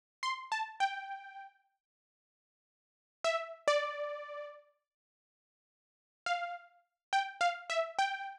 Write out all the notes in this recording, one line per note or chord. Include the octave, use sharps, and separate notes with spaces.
C6
A5
G5
E5
D5
F5
G5
F5
E5
G5